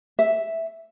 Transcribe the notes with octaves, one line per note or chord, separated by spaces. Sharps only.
E5